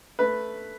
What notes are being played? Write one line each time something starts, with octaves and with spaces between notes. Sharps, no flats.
A3 B4